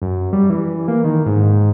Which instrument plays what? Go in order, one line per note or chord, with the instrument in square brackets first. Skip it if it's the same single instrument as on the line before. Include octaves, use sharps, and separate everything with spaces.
[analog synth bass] F#2
G3
E3
A#3
D#3
G#2